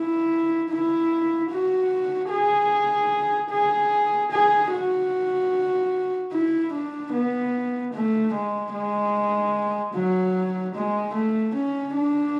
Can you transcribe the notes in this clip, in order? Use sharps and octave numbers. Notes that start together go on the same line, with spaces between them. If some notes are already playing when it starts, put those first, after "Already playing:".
Already playing: E4
E4
F#4
G#4
G#4
G#4
F#4
E4
D4
B3
A3
G#3
G#3
F#3
G#3
A3
C#4
D4